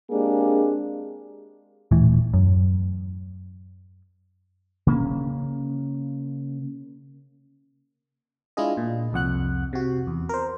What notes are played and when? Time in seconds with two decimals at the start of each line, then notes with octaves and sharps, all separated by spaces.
0.10 G#3 A#3 C4 D4 G4 G#4
1.91 D#1 A2 E3
2.34 F#2
4.87 C#3 A#3 C#4
8.57 G#3 D4 E4 F4 G#4 D#5
8.77 A#2
9.13 C2 F2 F#5 F#6
9.73 C3 F#4
10.07 E2
10.29 A#4 C5